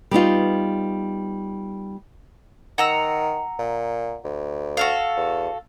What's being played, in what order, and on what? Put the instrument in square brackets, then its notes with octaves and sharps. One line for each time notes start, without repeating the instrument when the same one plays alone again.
[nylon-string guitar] G3 B3 D#4 F4
[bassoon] D#3 [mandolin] F#5 A#5 E6
[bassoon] A#2
D2
[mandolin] F#4 A4 F5
[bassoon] E2